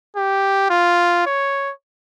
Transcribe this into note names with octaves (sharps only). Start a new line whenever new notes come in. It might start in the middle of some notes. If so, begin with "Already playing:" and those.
G4
F4
C#5